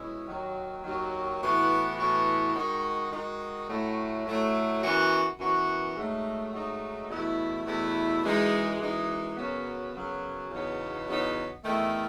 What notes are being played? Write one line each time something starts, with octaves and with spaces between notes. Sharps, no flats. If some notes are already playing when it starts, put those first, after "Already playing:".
Already playing: B2 G#3 C#4 E4
D#2 D#3 F#3
D#2 D#3 F#3
A2 E3 B3 F#4
A2 E3 B3 F#4
D#3 G#3 D#4 F#4
D#3 G#3 D#4 F#4
A2 F#3 A3
A2 F#3 A3
F#2 E3 B3 F#4
F#2 E3 B3 F#4
G#2 F#3 A3 D#4
G#2 F#3 A3 D#4
E2 B2 A3 E4
E2 B2 A3 E4
F#2 E3 G#3 D#4
F#2 E3 G#3 D#4
F#2 C#3 F#3 B3
F#2 C#3 F#3 B3
E2 C#3 F#3 B3 D#4
E2 C#3 F#3 B3 D#4
E2 D#3 A3